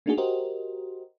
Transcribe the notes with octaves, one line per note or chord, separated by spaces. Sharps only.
A3 A#3 D4 D#4 F#4 G#4
F#4 G4 A#4 C5 D#5